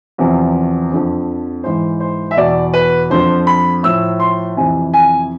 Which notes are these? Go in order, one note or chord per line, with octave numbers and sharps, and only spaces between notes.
E2 C3 F3
F2 D3 F3
G#2 E3 C5
C5
E5
E2 B2 D5
B4
F2 D3 F3 C5
B5
A2 F3 E6
C6
F2 C3 E3 G#5
G#5